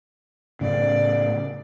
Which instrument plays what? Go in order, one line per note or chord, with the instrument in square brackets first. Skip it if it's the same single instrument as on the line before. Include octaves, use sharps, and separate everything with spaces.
[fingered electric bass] A2 C#3 [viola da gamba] D5